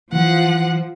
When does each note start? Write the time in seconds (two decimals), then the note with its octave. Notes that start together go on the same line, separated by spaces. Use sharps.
0.13 E3 F3 F#5